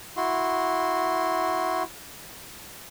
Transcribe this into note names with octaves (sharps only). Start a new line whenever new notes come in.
E4 F#4 C6